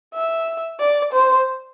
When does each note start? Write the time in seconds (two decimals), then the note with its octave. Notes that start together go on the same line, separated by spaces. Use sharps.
0.14 E5
0.80 D5
1.13 C5